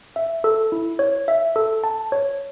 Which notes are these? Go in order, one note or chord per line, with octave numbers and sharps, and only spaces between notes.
E5
A4
E4
C#5
E5
A4
A5
C#5